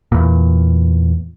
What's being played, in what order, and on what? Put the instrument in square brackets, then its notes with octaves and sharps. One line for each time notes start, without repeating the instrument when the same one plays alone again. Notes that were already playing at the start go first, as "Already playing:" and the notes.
[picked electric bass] E2 A#2